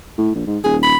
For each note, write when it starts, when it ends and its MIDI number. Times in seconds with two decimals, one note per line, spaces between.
0.18 0.32 45
0.35 0.42 34
0.47 0.59 44
0.64 0.95 27
0.64 0.76 68
0.83 0.98 83